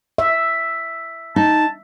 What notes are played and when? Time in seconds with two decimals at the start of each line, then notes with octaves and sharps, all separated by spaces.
0.18 E5
1.36 D#4 A5